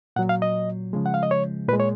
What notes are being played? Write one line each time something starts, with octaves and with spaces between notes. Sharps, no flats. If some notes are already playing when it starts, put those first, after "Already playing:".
A#2 F#3 F#5
F5
D#5
C#3 F3 G#3
F#5
F5
D#5
C#5
A#2 G#3 B4
C#5